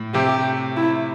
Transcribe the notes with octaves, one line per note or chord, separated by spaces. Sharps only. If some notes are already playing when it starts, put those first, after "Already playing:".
Already playing: A2
C3 G4
E4